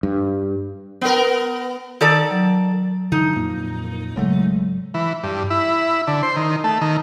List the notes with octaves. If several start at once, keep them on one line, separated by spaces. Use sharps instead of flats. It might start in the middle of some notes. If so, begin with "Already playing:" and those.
G2
B3 A#4
D#3 A4 D5
F#3
D3 E3 D#4
F2 A#2 A#3
G#1 C#3 F#3 G#3 A3
E3
G2
E4
D3
C5
D#3
A3
D#3